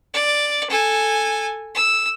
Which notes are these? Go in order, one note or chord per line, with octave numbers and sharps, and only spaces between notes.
D5
A4 G#5
E6